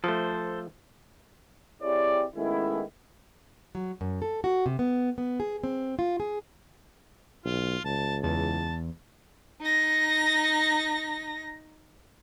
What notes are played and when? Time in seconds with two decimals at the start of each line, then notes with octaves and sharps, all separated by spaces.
0.04 F3 A3 A4 C5
1.83 C4 E4 G4 G#4 C#5 D5
2.36 D#3 G#3 A3 B3 C#4 E4
3.75 F#3
4.01 F#2
4.22 A4
4.44 F#4
4.66 C3
4.79 B3
5.18 B3
5.40 G#4
5.64 C4
5.99 F4
6.20 G#4
7.45 B1 F4
7.85 C#2 A5
8.23 E2 A5
9.61 D#4 A#6